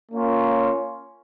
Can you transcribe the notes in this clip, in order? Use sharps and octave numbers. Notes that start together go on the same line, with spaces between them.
A#3 C#4 F4